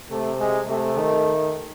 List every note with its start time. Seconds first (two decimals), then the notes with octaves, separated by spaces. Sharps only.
0.11 C3 A3
0.40 G#3
0.69 C3 A3
0.98 D#3